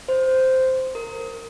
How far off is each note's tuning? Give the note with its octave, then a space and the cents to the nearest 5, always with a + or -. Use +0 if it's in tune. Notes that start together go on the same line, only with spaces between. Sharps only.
C5 -5
A#4 -20